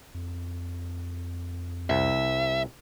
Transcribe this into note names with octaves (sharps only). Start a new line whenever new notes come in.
F2
C2 E5